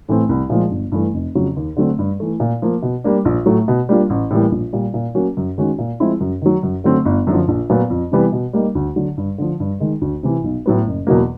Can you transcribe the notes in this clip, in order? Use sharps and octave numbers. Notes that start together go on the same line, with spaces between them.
A2 E3 A3 C4
C2
A#2 F3 G#3
G1
G2 E3 A3
F1
F2 C#3 F#3
D#2
D3 F#3 A3 C4
G2
E3 A3
A#2
F3 A#3
B2
G3 A#3 D4
A#1
A2 F#3 A3
B2
G3 A#3 D4 F4
A1
A2 E3 G3 A#3
A#1
A#2 G3
A#2
F#3 A#3 C#4 F#4
F#2
D#3 G#3 C#4 F#4
A#2
F3 G#3 C4 E4
F#2
D#3 F#3
F#2
D3 F#3 A3 C4
G1
F#2 D3 F3
A#1
A#2 F#3 B3
F2
C3 E3 G3 B3
B2
G3 A#3 D#4
D2
D3 F#3
G2
D3 F3
G2
D#3 G#3
D2
C3 E3
B1
A2 F#3 B3
F#1
E2 B2 F#3 A#3